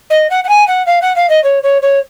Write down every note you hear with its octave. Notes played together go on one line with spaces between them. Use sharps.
D#5
F#5
F#5
G#5
F#5
F5
F#5
F5
D#5
C#5
C#5
C#5